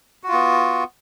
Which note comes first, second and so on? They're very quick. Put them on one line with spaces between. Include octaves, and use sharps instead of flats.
F#4 F4 B3